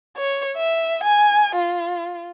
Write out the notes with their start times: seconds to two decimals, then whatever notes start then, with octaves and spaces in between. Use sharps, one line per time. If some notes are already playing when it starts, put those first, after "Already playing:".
0.17 C#5
0.57 E5
1.04 G#5
1.55 F4